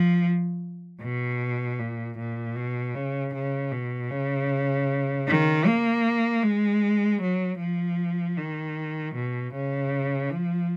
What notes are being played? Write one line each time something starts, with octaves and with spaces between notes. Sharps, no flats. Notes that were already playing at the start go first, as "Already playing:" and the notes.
Already playing: F3
B2
A#2
A#2
B2
C#3
C#3
B2
C#3
D#3
A#3
G#3
F#3
F3
D#3
B2
C#3
F3